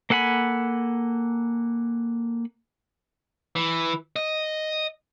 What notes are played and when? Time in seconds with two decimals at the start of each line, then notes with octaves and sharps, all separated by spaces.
0.10 A#3 A4 F#5 G#5 B5
3.56 E3
4.16 D#5